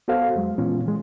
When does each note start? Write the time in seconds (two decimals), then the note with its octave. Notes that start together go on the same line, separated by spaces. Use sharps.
0.08 B3 F#4 A4 C5 F5
0.35 F2 F#3 G#3
0.58 A#2 E3 G#3 B3 C#4 F4
0.86 E3 G#3